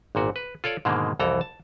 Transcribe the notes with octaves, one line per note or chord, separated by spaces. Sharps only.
G#1 A#2 F#4
B4
F4 A4 C#5 D5
G#2 B2 D3 D#3 G#3 A#3
C2 F2 E3 A4 A#5
A5